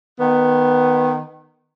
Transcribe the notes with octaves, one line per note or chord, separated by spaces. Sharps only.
D#3 B3